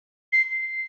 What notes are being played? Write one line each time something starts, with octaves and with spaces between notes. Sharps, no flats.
C7